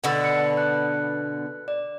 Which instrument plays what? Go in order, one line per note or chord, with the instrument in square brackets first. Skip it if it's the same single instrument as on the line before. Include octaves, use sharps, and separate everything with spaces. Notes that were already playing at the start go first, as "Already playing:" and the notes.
[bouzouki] B2 D3 B3 [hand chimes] F#5 E6 A6
[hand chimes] C#7
B4 F#6
D5